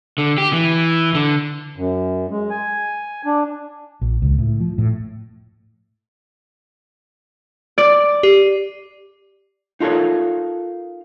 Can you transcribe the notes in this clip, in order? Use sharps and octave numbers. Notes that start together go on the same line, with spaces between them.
D3
G4
E3
D3
F#2
G#3
G#5
D4
A#1
C#2
A2
F3
A2
D5
G4
D#4 F4 A4 A#4 C#5